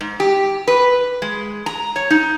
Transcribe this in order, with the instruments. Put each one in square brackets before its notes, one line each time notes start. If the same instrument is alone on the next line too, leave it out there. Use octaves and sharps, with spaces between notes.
[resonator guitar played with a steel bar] G#2
G4
B4
G#3
A#5
C#5
D#4